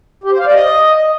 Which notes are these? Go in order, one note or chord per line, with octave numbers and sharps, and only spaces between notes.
G4
C5
F5
D5
D#5